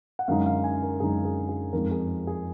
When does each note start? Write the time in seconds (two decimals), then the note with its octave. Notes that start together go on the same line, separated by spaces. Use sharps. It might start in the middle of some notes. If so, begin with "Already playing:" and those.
0.19 F#5
0.28 F#2 D3 G#3 D#4 F5
0.46 F5
0.64 G#5
0.82 A#4
1.00 F#2 D3 G#3 D#4 G#4
1.25 G#4
1.49 G#4
1.73 F2 F3 G#3 D#4 A#4
1.91 G#4
2.27 G#4